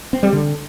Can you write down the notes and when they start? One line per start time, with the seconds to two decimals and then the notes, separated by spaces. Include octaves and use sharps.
0.13 C4
0.23 G3
0.33 D3